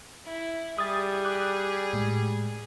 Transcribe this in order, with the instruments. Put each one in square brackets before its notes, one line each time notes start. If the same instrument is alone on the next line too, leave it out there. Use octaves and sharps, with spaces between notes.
[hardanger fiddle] E4
[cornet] G3 [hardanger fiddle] G#4 [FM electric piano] D#6 A6
[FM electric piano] D6 F#6
A2 G#3